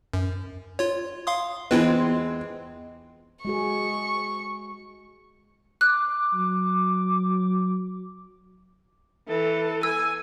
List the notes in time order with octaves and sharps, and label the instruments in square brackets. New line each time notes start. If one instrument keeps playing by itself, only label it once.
[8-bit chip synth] F#2
F4 C#5
F5 C6 D#6
[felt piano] E2 [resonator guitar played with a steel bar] G#3 C4 [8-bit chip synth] E4 F4 B4
[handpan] G#3 F#4 G#4 [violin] C#6
[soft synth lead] D6 [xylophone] F#6
[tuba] F#3
[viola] E3 A4
[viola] G#5 [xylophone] E6